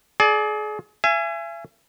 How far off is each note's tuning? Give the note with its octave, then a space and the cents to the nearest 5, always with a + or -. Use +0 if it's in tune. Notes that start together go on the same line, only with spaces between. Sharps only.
G#4 +35 D5 +0
E5 +40 G#5 +0